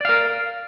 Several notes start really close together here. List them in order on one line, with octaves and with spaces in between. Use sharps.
D5 F5 A#4